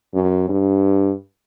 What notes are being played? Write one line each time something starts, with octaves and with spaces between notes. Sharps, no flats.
F#2
G2